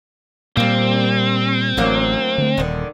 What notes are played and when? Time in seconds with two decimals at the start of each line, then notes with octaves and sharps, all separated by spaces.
0.57 A#2 G3 A#3 C4
1.77 A1 D2 F#3 A#3
2.38 D3 A3
2.57 D#1 D3 D#3